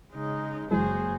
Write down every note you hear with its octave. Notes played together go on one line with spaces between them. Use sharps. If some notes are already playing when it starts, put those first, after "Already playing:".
C#3 G#3 D#4
F#1 E3 F#3 G#3 F#4 G#4 C5